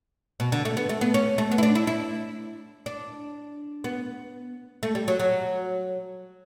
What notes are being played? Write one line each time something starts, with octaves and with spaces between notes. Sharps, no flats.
B2
D3
A3
B3
A3
B3
C#4
A3
B3
E4
D4
E4
E4
D4
B3
A3
G3
F#3
F#3